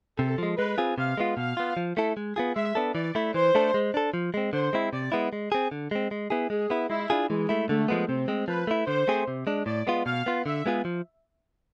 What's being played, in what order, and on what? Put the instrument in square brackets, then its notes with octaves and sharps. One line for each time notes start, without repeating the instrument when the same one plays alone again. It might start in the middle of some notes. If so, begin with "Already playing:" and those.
[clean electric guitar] C3 [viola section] A4
[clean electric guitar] F3 G#3
[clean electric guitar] G#3 [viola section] B4
[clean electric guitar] C4 F4 G#4
[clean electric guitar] C3 [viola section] F5
[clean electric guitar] G#3 B3 F4
[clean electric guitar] B2 [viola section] F5
[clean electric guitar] B3 F4
F3
A3 E4 A4
G#3
B3 F4 G#4
[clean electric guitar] G#3 [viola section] E5
[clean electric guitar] B3 D4 A4
[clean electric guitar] E3 [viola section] D5
[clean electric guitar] A3 E4
[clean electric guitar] E3 [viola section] C5
[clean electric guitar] A3 D4 A4
G#3
D4 A4
F3
G#3 C4
[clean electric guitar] D3 [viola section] C5
[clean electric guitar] G#3 C4 E4
[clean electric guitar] C3 [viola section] D5
[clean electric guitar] G#3 B3 E4
G#3
C4 G#4
D3
G#3 C4
G#3
B3 E4 G#4
[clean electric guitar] G#3 [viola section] G#4
[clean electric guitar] B3 E4
[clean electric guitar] G#3 [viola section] E4
[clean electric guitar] D4 F4 G#4
[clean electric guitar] E3 [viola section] G#3
[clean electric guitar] A3 E4
[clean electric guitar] D3 [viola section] A3
[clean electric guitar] F3 G#3 B3
[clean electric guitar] C3 [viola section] C4
[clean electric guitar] G#3 C4
[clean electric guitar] F3 [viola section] B4
[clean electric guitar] A3 E4
[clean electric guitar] D3 [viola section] C5
[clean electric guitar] A3 C4 G#4
C3
G#3 D4
[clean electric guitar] A2 [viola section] D5
[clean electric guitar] G#3 B3 F4
[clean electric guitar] B2 [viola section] F5
[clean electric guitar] B3 F4
[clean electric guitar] D3 [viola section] E5
[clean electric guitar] G#3 B3 F4 G#4
F3